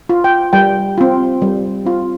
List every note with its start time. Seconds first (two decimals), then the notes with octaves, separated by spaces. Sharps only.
0.09 F4
0.24 G5
0.53 G3 G5
0.98 C4 F4
1.42 G3
1.85 C4 F4